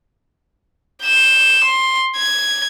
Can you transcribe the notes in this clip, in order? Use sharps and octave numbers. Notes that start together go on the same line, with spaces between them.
G6 E7
C6
G#6